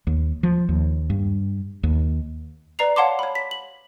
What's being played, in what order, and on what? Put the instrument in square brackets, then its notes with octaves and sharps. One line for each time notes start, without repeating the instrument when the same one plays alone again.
[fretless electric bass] D#2
F3
D#2
G2
D#2
[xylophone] B4 D5 A#5 C7 F7
C#5 F5 F#5 A5 C6 D6
C#5 B5
B6
F#7